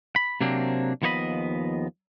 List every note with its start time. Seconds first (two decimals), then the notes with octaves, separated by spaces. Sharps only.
0.16 B5
0.41 C3 F#3 A#3 C4 D4
1.02 D#2 F3 B3 C#5 D#5 B5